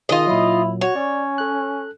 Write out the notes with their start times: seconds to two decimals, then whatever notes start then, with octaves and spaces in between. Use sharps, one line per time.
0.09 D#3 F4 G#4 D#5
0.27 A#2 F#3 E4
0.81 F#4 C#5
0.96 C#4 D5
1.38 A4 F#6